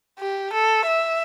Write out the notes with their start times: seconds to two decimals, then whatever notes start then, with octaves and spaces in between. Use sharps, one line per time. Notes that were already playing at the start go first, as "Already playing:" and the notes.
0.19 G4
0.53 A4
0.87 E5